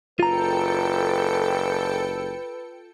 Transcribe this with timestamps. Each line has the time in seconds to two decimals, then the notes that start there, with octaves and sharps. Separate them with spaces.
0.20 F#1 F4 A4 B4 G5 A#5 C#7